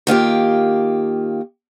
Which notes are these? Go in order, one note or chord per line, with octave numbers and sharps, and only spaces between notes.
D#3 A#3 F4 G4